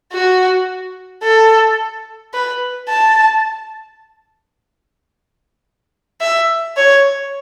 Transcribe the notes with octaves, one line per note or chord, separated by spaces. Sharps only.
F#4
A4
B4
A5
E5
C#5